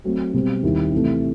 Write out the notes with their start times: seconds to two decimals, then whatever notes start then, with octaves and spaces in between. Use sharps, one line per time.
0.04 F#3 A3 C4
0.34 B2 G3 C4
0.63 D#2 D#3 G3 C4 E4
0.92 C3 E3 A3